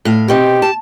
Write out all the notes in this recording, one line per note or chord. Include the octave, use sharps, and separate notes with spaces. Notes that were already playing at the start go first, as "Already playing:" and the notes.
A2 F5
B2 C4 D#4 G4
A5